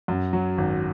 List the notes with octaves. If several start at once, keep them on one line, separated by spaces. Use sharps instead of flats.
F#2
F#3
G#1